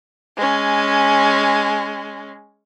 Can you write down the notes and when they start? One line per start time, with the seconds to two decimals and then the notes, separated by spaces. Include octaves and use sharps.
0.37 G#3 C#4